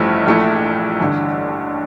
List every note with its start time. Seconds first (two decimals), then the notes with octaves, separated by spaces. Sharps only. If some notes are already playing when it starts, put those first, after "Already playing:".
Already playing: A1 G2 F3 A3 E4
0.26 A#1 A#2 A3 E4
1.00 A1 G2 D3